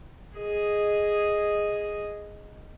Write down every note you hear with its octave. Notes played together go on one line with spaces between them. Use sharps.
G#4 D#5